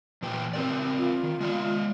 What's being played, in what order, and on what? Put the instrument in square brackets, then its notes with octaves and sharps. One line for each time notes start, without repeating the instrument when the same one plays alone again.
[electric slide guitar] A#2 E3 G5
C4 A#4 D5
[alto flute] F4
[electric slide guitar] D#3
G#3 D5